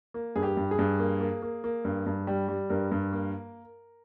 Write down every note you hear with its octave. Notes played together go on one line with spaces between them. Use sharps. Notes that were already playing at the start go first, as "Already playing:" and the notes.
A#3
G2 G#4
G4
G2
G#4
G2
A#3
A#3
A#3
A#3
G2
G2
G3
G3
G2 A#4
G2
A#3